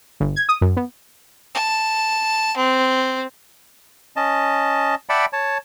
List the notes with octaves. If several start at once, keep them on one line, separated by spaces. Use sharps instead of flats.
G1
G#6
D#6
F#2
B3
A5
C4
C#4 D#5 A5
D5 E5 F#5 G5 A5 B5
C#5 A5